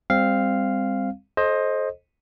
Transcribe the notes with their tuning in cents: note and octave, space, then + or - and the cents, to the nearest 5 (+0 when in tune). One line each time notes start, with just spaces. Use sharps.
G3 +35 C4 +0 F5 -5
A4 -30 C5 +20 D#5 +0